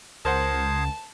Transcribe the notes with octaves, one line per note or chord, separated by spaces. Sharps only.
C#2 A#4 C5 F#5 A5 D#6 G#6 C7